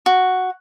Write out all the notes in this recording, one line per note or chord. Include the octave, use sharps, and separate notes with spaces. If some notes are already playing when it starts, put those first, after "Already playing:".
F#4